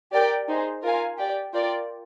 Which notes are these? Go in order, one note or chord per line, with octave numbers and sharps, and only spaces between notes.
G4 A#4 D5 G5
D#4 G#4 C5
F4 A#4 F5 G#5
G4 D5 G5
F4 A#4 D5 G5